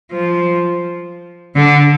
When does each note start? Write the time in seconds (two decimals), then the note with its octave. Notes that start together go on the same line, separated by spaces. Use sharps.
0.12 F3
1.56 D3